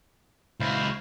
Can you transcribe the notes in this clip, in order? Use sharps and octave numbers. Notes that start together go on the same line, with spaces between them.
C#2 E4 F#4 C5 F5